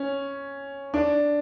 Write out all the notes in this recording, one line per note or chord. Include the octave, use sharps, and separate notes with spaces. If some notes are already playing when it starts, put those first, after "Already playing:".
Already playing: C#4
D4